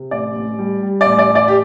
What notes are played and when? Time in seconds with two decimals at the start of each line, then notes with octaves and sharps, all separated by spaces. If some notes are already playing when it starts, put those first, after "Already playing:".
Already playing: C3
0.11 A1 D5
0.35 A1
0.59 G3
0.83 G3
1.01 A1 D5
1.18 D5
1.29 A1
1.35 D5
1.48 G4